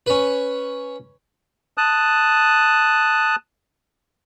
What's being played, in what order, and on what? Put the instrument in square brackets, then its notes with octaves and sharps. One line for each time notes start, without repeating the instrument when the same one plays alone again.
[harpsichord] C#4 B4
[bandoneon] A5 D#6 F#6